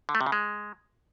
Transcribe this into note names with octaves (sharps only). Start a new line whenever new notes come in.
D3
A3
C3
C#3
G#3